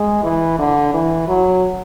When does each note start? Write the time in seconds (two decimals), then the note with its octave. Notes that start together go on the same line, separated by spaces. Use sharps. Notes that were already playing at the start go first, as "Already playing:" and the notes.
Already playing: G#3
0.23 E3
0.59 D3
0.94 E3
1.28 F#3